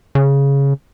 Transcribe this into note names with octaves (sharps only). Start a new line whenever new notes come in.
C#3